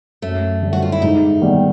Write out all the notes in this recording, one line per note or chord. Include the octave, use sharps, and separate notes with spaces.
F#2 A3
D3 G3
F#4
F4
E4
G#2 D#4
D#3 G3 B3